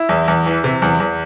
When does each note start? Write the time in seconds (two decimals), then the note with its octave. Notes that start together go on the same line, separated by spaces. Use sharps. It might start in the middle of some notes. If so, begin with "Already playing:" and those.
Already playing: E4
0.09 E2
0.28 E2
0.46 E3
0.64 C3
0.82 E2
1.00 E2